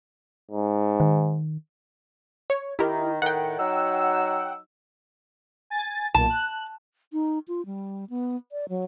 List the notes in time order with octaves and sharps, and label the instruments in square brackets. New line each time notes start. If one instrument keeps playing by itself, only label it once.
[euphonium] G#2
[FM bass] D#3
[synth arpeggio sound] C#5
[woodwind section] D#3 [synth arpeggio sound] E4 G4 A#4
[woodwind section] A2 D#3 [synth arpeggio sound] F#5 G5
[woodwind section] F#3 D#4 E6
[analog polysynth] G#5 A6
[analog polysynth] B1 A#2 [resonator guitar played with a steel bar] A5
[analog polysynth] F#6
[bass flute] D#4
F4
G3
B3
D5
F#3